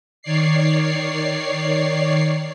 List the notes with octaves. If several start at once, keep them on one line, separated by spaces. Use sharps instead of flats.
D#3 C#5 D5 C7